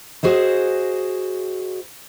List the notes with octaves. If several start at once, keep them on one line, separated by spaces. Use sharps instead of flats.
F#4 G#4 C5 D#5